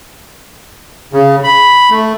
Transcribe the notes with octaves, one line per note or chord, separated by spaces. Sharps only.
C#3
B5
A3